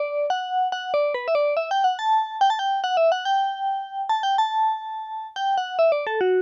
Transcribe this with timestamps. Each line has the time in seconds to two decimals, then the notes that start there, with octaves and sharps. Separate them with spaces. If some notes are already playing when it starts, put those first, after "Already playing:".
Already playing: D5
0.30 F#5
0.72 F#5
0.94 D5
1.14 B4
1.28 E5
1.35 D5
1.57 E5
1.71 G5
1.84 F#5
1.99 A5
2.41 G5
2.50 A5
2.59 G5
2.84 F#5
2.97 E5
3.12 F#5
3.25 G5
4.09 A5
4.23 G5
4.38 A5
5.36 G5
5.58 F#5
5.79 E5
5.92 D5
6.07 A4
6.21 F#4